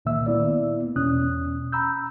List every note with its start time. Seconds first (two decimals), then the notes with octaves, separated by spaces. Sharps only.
0.05 C#2 A#2 D#3 A#3 E5 E6
0.26 A#3 B3 E4 D5
0.96 E2 B2 C#4 D#6 F#6
1.72 A#5 B5 E6 G6